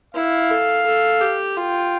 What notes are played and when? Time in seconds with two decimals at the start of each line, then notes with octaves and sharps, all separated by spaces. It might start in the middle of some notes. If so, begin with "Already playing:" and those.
0.15 E4 F5
0.51 A4
0.86 A4
1.21 G4
1.57 F4 G5